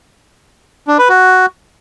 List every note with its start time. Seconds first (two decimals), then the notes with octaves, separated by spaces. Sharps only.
0.88 D4
0.98 B4
1.09 F#4